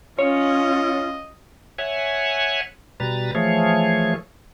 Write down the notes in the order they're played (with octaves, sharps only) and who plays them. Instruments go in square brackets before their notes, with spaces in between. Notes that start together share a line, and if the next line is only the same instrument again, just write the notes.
[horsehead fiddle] C#4 F4 [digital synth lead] C#5 [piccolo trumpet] D#5
[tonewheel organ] C#5 E5 F#5 G#5
B2 G3 B4 A#5 A6
E3 F3 A3 G#4 C#5